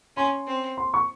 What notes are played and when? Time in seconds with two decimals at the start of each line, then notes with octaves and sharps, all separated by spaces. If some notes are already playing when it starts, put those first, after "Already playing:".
0.17 C#4 C6
0.47 C4
0.77 C6
0.94 C#6